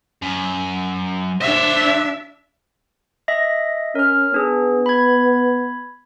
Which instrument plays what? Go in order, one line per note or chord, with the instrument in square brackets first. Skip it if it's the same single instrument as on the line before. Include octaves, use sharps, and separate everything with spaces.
[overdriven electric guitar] F#2
[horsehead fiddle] D4 E5 [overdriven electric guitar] C5 C#5
[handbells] D#5 E5 A#6
[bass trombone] C#4 [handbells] A#4 F6
[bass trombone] B3 [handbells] D4 G#4
[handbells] B5 G#6